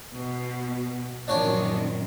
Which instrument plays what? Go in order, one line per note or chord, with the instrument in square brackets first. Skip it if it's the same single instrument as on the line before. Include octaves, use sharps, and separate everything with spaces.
[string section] B2
[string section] A#1 [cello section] F#2 D#3 C4 [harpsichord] D4 C#5 G#5